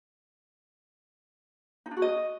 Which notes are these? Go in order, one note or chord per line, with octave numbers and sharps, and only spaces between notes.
D#4
D4
F#4
D#5